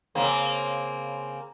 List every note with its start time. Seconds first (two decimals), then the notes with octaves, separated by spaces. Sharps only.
0.15 C#3 A#3 C4